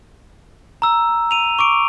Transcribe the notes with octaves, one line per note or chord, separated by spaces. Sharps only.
A#5 E6
D#7 F7
C#6 D6 D7